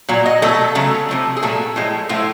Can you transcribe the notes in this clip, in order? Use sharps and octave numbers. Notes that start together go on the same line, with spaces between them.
A#2 F#3
D#5
B2 F#3 A3 A4
C#3 F#3 A3
C3 F3 A3
G#4
A#2 F#3 A3 A4
A2 F3 G#3
A2 F3 A3 F4